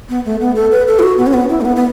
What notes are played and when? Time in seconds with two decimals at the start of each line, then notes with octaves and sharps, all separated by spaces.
0.10 B3
0.25 A3
0.41 B3
0.56 A4
0.72 B4
0.88 A4
0.99 E4
1.03 F#4
1.18 B3
1.27 C#4
1.34 B3
1.49 E4
1.61 A3
1.65 B3
1.76 B3